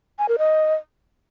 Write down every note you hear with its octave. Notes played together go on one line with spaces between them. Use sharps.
G#5
A#4
D#5